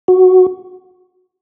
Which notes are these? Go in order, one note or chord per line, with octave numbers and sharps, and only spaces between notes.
F#4